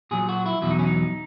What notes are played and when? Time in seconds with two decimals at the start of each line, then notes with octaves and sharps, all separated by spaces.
0.11 A#2 F#3 G#4
0.29 F#4
0.46 E4
0.62 E2 B2 F#3 E4
0.70 D#4
0.79 C#4
0.87 D#4